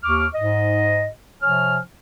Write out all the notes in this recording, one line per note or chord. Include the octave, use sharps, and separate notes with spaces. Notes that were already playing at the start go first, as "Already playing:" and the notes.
D#2 C#6 D6 F6
G#2 D#5
C3 F3 C#5 G#5 F6